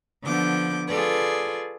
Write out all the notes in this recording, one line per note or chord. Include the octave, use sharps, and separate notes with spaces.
D3 F3 B3 D6 G6
F4 G#4 A4 B4 D5